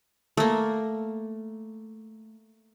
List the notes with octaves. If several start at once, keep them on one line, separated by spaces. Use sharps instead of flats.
A3 A#3